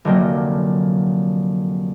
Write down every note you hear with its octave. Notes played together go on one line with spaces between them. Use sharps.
F1 D3 F#3 A#3 G5